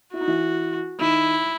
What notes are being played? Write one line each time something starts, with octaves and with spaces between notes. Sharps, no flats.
E4 F#4
D#4
E3 E4
D#3 D#4 E4